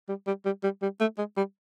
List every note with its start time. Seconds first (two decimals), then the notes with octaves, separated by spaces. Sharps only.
0.09 G3
0.27 G3
0.45 G3
0.63 G3
0.82 G3
1.01 A3
1.18 G#3
1.37 G3